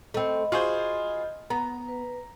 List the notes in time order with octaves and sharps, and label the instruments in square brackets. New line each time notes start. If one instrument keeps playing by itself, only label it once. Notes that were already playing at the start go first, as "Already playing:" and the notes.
[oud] A3 C4 [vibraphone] D#5 B5
[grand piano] F4 G#4 C5 [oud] F#4
[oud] B3 [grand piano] A#5
[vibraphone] B4